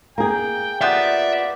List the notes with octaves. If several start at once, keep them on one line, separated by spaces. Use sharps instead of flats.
A#3 G#4 G5
B3 F4 G4 D5 E5